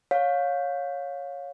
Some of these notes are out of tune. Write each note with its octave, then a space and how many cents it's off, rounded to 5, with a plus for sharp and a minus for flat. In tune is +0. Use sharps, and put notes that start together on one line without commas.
C#5 +0 F5 +25